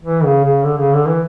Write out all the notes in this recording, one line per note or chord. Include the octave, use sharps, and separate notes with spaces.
E3
C#3
C#3
D3
C#3
D3
E3